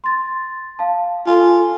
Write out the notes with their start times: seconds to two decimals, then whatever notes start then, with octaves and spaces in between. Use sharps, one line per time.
0.04 C6 A6
0.79 F5 A5
1.27 F4 A4 G#5